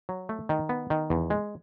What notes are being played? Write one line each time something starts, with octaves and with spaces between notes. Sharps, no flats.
F#3
A3
D#3
B3
D#3
E2
G#3